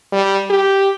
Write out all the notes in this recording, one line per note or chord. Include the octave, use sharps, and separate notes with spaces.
G3
G4